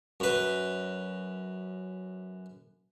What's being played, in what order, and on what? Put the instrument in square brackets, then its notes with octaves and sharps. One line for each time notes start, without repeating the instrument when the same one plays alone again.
[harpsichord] F#2 B4